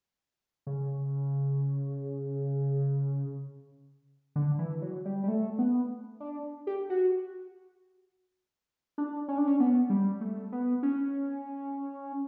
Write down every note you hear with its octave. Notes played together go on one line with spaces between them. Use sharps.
C#3
D3
E3
F#3
G3
G3
A3
B3
D4
G4
F#4
D4
C#4
D4
C#4
B3
G3
A3
B3
C#4